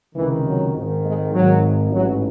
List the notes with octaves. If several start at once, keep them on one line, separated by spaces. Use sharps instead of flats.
C#2 C3 D#3 E3
F#3
G#1 G#2 D#3
G#3
G#1 G#2 D#3 F#3
A1 G#2 E3 F#3